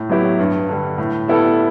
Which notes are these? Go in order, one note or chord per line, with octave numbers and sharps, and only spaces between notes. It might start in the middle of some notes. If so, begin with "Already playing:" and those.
Already playing: A2
F#3 B3 E4 G4
G2
D3 G3
A2
G3 B3 E4 A4